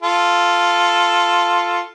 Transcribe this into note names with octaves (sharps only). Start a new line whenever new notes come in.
F4 A4